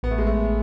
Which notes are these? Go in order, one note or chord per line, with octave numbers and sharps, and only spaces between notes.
A1 B3
A3
G#3
A3